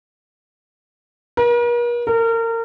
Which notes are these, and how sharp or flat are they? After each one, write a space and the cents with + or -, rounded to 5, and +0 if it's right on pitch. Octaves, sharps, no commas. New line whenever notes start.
A#4 +45
A#4 -30